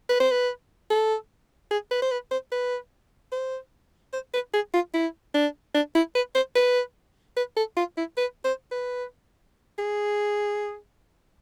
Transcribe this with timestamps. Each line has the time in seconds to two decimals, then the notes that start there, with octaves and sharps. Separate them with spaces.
0.09 B4
0.20 C5
0.31 B4
0.90 A4
1.71 G#4
1.91 B4
2.02 C5
2.11 B4
2.31 C5
2.52 B4
3.32 C5
4.13 C5
4.34 B4
4.54 G#4
4.74 F4
4.94 E4
5.35 D4
5.75 D4
5.95 E4
6.15 B4
6.35 C5
6.56 B4
7.37 B4
7.57 A4
7.77 F4
7.98 E4
8.18 B4
8.45 C5
8.72 B4
9.79 G#4